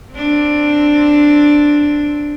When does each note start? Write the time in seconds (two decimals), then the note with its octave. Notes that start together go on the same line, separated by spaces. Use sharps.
0.13 C4 D4